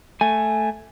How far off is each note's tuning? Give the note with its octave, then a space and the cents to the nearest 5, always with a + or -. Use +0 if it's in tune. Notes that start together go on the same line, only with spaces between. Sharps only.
A3 +0 G#5 +0